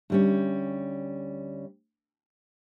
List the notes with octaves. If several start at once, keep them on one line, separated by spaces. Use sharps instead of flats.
D2 G3 C#4